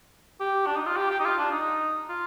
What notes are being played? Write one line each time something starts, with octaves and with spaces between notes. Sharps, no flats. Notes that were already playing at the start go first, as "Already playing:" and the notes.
G4
D4
D#4
F4
G4
G4
D#4
F4
D4
D#4
F4